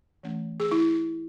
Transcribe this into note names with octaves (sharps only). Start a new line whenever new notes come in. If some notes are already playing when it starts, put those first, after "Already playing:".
E3 A3 C#4
G#4
E4